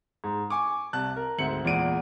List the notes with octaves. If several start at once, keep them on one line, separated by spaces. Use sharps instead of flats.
G#2
G#5 C#6 D6
C2 A5 F#6
A#4
D2 G#2 C4 E5 C#7 F#7
E2 A#2 G#3 D7 D#7